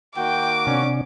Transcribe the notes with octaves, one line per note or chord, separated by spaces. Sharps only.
D#3 A#3 F#4 G5 D6
C3 C#4 D4